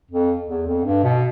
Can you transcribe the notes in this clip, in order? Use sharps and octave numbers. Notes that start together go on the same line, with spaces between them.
F2
E2
F2
G2
B2